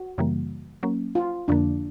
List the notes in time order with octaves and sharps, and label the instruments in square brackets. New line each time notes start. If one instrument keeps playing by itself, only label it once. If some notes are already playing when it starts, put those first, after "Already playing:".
Already playing: [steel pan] F#4
[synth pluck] F#2 C#3 E3 G3 A#3
F#3 A#3 C#4
[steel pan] F4
[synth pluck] F2 D3 F3 A#3 [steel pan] D4